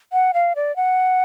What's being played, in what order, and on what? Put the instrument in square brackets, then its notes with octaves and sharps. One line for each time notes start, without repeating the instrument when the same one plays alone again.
[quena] F#5
F5
D5
F#5